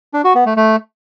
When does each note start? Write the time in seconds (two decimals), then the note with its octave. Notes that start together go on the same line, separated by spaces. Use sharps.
0.14 D4
0.24 F#4
0.35 B3
0.46 A3
0.56 A3